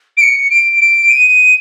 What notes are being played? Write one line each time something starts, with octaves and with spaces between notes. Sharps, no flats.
D7
C#7
D7
D7
D#7